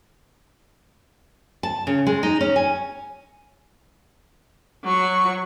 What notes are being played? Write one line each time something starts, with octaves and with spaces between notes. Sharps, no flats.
A5
C#3
G#3
D#4
C#4
G#5
F#3 C#6